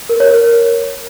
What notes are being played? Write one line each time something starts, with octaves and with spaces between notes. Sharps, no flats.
A#4
C#5
A#4